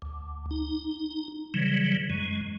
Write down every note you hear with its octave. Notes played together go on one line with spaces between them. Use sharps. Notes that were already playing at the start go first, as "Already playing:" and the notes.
D2
D#4
C#3 E3 F#3 G3
F#2 G#3